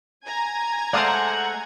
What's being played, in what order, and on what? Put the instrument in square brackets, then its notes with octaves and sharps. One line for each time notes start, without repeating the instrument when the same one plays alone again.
[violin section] G#5 A#5 G#6
[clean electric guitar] G#3 A3 C5 [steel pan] D5 F5 D#6 [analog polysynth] F#5